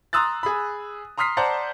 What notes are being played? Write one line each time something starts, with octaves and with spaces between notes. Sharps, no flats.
A#5 C6 D#6 E6 F#6 A6
G#4 B5
A#5 C6 D#6 F6 B6 C7
C5 D5 F#5 A5 A#5